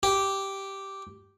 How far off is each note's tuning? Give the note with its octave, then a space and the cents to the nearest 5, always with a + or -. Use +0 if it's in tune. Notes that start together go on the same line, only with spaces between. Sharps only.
G4 -5